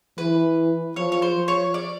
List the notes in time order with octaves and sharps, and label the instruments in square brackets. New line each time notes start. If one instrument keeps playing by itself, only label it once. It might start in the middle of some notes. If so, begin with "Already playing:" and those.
[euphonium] E3 [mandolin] B4
[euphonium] F3 [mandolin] C#5
[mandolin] C#5
C5
[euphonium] F3
[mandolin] C#5
D5